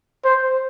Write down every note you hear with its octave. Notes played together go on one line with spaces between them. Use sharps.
C5